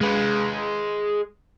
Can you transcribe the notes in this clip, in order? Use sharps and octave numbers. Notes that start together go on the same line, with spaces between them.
G#3 B4